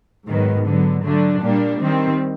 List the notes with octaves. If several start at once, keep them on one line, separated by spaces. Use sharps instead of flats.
G#2 D#3 F#3 B3
D3 F#3 B3
D3 F#3 A3 D4
A#2 G3 A#3 D4
D#3 G3 C4